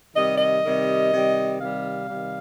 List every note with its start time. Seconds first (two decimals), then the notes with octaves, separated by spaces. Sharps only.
0.14 C3 D#3 G3 D#5
0.38 D#5
0.63 C3 D#3 G3
1.11 C3 D#3 G3
1.59 C3 D#3 G3 F5
2.07 C3 D#3 G3